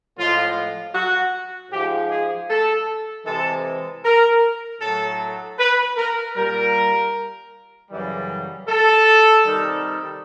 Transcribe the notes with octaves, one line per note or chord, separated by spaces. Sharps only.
A2 F3 G#3 F4
F#4
G#2 F3 G#3 G4
G#4
A4
C3 E3 G#3 A4
A#4
A2 F#3 A4
B4
A#4
A#2 G3 A#4
F#2 C#3 E3 G3
A4
C3 D#3 G3